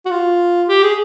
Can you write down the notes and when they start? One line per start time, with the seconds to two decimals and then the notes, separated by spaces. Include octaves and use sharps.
0.06 F#4
0.10 F4
0.68 G4
0.83 G#4